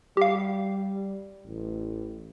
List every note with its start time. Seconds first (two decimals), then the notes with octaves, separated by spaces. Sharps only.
0.17 G3 G4 F5
1.47 A1